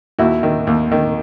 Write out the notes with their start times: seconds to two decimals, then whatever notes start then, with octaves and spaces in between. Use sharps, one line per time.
0.19 D#2 E4 F#4
0.43 D#3
0.67 D#2
0.92 D#3